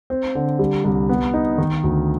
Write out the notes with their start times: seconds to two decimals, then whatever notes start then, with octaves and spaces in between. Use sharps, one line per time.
0.10 C4
0.35 D3
0.59 G3
0.84 C2
1.09 B3
1.34 D#4
1.58 D#3
1.83 D2